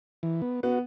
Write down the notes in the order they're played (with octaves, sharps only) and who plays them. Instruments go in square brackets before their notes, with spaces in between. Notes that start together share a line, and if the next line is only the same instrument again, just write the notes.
[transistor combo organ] E3
B3
[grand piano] B3 [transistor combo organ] F#4